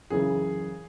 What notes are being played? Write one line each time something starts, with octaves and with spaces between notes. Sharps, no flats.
F#2 C#3 E3 G#4